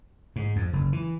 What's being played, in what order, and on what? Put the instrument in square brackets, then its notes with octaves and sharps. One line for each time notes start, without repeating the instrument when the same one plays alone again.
[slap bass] G#2
F2
F#1
E3